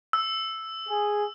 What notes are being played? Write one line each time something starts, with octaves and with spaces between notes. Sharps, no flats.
E6
G#4